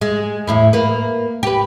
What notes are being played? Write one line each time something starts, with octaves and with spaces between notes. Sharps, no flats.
G#3
E2 A2 E4
A#3 B4
G4 B4